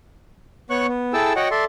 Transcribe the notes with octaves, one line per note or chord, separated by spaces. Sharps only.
B3 C#5 C#6 F#6
B3
E4 G#4 A4 G5 A5 E6
F#4 C#5 D#5 F#5 G5
A4 D5 E5 C6